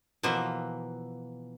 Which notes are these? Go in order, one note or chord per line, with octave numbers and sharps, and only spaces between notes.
B2 E3 F3 A#3